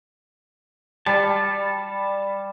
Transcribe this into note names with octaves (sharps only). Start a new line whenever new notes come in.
G3 A5